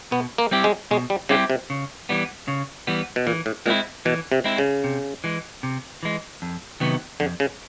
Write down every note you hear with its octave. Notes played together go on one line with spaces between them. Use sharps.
B2 B3
A#3
G3 C4 E4 G4
G#3
B2 G#3
G3
C#3 G3 C4 E4 G4
C3
C#3
E3 G3 B3
C#3
E3 G3 B3
B2
A#2 E3
A2
A#2 G#3 C4 E4
B2 E3
C3
G#3 C4 E4
C#3
C3
E3 G#3
C3
E3 G#3
F2
C3 D#3 F#3 B3
F2 D3
C#3